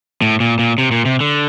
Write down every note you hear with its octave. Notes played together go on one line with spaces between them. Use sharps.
A2
A#2
A#2
C3
A#2
C3
D3